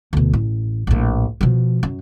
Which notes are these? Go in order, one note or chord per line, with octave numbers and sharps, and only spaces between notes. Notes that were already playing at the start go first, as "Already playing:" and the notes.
D2 B2
A1
A#1 A2
B2 F3
F#2